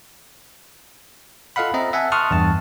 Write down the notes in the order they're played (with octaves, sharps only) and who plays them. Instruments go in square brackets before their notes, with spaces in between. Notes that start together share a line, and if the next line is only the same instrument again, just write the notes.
[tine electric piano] F4 A4 D#5 F5 F#5 B5
C4 D#5 E5 A#5
E5 F#5 G#5 A5
A5 C6 C#6 D#6 F6 F#6
E2 G2 A5